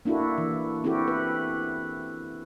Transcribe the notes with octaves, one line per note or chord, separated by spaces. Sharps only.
A#3 D4 E4 F#4 A4
E3
C4 E4 F#4 G4 A4
B4